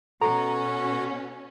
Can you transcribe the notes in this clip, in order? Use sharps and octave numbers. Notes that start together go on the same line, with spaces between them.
B2 C#4 F#4 A4 A#5